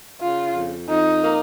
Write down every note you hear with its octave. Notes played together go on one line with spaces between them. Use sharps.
C#3 F4
F2
F2 D#4
A#3